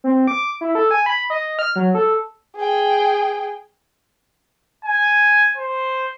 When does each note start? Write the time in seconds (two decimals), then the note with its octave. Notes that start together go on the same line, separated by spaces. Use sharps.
0.04 C4
0.27 D6
0.61 E4
0.75 A4
0.91 G#5
1.06 B5
1.30 D#5
1.59 F6
1.76 F#3
1.95 A4
2.57 G#4 G5
4.85 G#5
5.57 C5